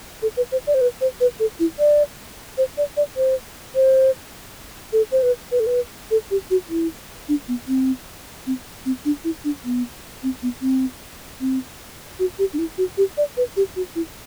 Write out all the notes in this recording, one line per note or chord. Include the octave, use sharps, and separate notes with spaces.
A4
B4
C5
D5
C5
B4
C5
B4
A4
E4
D5
C5
D5
D5
C5
C5
A4
C5
B4
B4
A4
B4
A4
G4
F#4
E4
D4
B3
C4
C4
C4
D4
E4
D4
B3
C4
B3
C4
C4
F#4
G4
D4
E4
F#4
G4
D5
B4
G4
F#4
E4